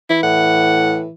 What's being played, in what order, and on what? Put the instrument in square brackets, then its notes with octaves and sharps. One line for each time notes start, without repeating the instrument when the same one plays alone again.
[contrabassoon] E3 [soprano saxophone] E4
[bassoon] A2 [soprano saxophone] F#5